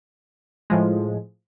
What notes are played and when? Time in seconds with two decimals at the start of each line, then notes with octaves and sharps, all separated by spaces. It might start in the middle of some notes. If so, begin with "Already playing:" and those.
0.70 A2 F3 G#3